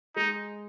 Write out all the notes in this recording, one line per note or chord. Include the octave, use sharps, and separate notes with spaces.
G#3 D#4